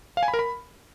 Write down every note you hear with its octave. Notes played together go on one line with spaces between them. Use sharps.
F5
G#5
B5
A#4
B5